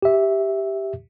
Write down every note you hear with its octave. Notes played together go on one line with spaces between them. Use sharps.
G4 E5